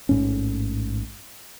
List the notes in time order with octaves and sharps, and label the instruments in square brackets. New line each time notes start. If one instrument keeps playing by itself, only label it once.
[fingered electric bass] A1 G#2 C#4